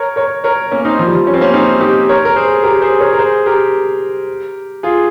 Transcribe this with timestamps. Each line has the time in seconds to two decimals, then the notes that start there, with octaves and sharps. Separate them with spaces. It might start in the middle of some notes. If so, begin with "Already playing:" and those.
Already playing: A#4 C#5
0.16 A#4 C#5
0.44 A#4 C#5
0.72 A#3 C#4
0.85 C4 D#4
0.99 F3
1.07 G3
1.15 F3
1.27 C#4
1.34 C4
1.41 A#3 C#4
1.54 C4 D#4
1.81 D#4 G4
2.09 A#4 C#5
2.25 A#4
2.36 G#4 C5
2.63 G4 A#4
2.82 G#4 C5
3.00 A#4 C#5
3.13 A#4
3.19 G#4 C5
3.46 G4 A#4
4.83 F4 G#4